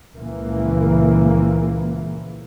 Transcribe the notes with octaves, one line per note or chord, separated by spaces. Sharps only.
C#2 A#2 E3 F3 A#3